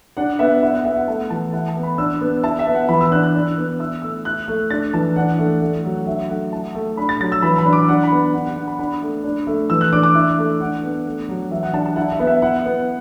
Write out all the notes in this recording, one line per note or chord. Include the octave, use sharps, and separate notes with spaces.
D4 F#5
B3 E5
E4 F#5
F#5
B3 E5
F#5
A3 A5
E3 A5
E4 F#5
A5
B3
B5
D4 E6
B3
E4 A5
E5
B3
F#5
E3 B5
E6
D4 F#6
F#6
D4
B3
E4 E6
A3 E6
E4 F#6
A3
D4 A6
E3 A5
D4 F#5
A3
A3
F#3
D4 E5
A3 F#5
E4 A5
A3
D4 B5
A6
F#3 A6
E6
E3 B5
B5
D4
D6
D4 F#5
B5
B3
F#5
D4 F#5
F#5
B3 F#5
B5
D4 B5
A3
D4
A3
E3 E6
F#6
D4 D6
D6
E4
A3
D4 F#5
B3
A3
F#3
E3 E5
F#5
D4 A5
A5
E4 F#5
E5
B3
E5
E4 F#5
B3